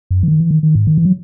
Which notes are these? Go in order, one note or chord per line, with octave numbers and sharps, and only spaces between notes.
F#2
E3
D#3
E3
D#3
D#3
G#2
D#3
E3
F#3